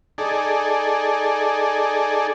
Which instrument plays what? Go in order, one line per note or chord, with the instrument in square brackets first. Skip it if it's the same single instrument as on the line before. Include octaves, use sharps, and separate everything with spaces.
[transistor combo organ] D#4 G#4 A4 D5